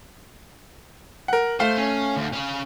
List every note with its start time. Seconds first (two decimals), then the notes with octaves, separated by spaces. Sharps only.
1.28 A#4 F#5
1.60 A3 C5 F5
1.77 C#4
2.17 D2
2.33 C#4 F5